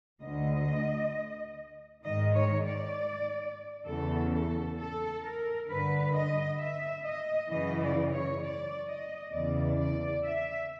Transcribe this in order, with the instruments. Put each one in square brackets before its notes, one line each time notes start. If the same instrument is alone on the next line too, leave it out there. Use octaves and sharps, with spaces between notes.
[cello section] D2 D3 D#5
G#2 D#3 D#5
C#5
D5
E2 C#3 E3 A4
A4
A4
A#4
G2 D3 B4
D#5
E5
D#5
F#2 C#3 E3 D#5
D5
C#5
D5
D#5
E2 C#3 E3 D5
D5
E5